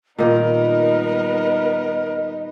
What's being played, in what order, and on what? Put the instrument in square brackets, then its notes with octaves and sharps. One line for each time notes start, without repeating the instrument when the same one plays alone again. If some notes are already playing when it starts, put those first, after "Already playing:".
[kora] A#2 D#3 [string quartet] G3 B3 D#4 [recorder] A#4 [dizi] D#5